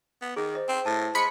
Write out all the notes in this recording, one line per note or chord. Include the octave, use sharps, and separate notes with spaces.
B3
D#3 G#4
C5 D#5
C4
A2 A5
G#3 B5 C6 B6 C#7